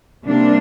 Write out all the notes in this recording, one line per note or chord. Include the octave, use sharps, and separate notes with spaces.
C3 G3 A#3 D4